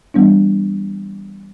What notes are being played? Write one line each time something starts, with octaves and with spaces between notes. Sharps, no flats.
E3 G3 B3 D4